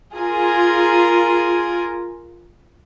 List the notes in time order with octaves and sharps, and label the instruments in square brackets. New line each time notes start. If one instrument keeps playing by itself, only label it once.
[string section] F4 G#4 A#4 G#5